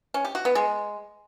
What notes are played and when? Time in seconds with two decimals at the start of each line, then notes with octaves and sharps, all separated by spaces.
0.14 C#4
0.25 G4
0.35 F#4
0.45 B3
0.55 G#3